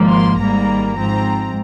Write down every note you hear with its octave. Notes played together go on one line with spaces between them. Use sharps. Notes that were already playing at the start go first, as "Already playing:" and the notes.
Already playing: G#1 G#2 F3 A#3
C6
G#1 G#2 G3 A#3 A#5
G#2 F3 C4 A#5